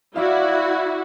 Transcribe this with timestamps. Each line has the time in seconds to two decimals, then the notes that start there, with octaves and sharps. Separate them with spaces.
0.16 E4 F#4 D5 E5 F5